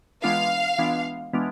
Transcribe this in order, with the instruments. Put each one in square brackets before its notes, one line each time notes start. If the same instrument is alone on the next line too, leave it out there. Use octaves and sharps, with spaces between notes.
[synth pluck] E3 G#3 B3 D4 F4 [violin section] F5
[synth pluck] E3 G#3 B3 D4 F4
E3 G#3 B3 D4 F4